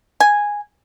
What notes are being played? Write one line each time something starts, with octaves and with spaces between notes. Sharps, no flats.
G#5